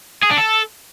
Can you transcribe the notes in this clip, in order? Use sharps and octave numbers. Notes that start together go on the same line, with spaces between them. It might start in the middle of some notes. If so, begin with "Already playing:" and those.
G#4
D4
A4